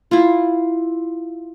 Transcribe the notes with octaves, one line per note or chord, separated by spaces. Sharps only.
E4 F4